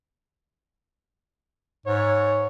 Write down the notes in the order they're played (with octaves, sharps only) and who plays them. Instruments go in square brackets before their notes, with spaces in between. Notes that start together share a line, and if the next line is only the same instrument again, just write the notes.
[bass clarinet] G#2 [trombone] C#5